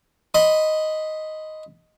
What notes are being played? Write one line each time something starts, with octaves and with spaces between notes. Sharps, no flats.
D#5 B5 C6